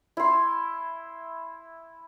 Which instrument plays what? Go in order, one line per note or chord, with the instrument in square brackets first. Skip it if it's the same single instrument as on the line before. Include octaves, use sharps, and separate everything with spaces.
[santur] E4 C6